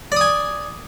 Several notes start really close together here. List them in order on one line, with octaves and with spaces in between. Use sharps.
D5 D#6 G#5